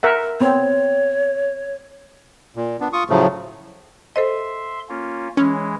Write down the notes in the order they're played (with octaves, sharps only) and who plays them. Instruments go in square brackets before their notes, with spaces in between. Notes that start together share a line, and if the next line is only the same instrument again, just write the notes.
[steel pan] A#4 E5 F#5
[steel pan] B3 C4 [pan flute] C#5
[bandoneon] A#2
B3 D4
F4 C#6 D#6
A2 C#3 F3 F#3 A3
[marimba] A4 C5 D#5 [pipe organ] E5 C6
[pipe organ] A#3 C#4 F4
[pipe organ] E3 G#3 [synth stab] C#4